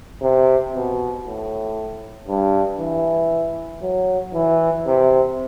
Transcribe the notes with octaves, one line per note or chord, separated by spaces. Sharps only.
C3
B2
A2
G2
E3
F#3
E3
C3